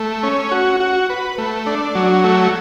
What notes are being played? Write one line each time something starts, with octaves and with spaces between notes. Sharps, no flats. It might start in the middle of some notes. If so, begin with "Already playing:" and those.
Already playing: A3
C#4
F#4
F#4
B4
A3
D4
F#3
A3